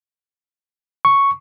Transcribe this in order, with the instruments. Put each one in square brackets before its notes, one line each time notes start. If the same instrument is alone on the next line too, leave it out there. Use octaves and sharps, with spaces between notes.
[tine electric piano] C#6